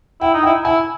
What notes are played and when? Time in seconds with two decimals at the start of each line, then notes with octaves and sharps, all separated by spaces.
0.21 E4 G5
0.34 D#4
0.43 E4 G5
0.64 E4 G#5